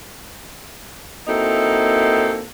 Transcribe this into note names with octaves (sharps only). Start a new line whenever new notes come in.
A#3 C4 D#4 E4 F#4 A4